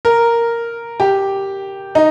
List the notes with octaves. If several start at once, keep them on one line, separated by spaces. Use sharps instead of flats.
A#4
G4
D#4